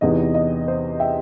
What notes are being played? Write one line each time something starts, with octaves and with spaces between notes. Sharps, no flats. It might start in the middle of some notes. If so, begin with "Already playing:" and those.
E2 C3 E3 B3 D#4 D#5
D#5
C5
E5 G5